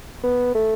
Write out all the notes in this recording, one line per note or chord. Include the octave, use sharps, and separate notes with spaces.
B3
A3